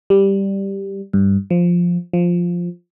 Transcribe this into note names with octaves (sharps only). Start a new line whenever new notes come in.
G3
G2
F3
F3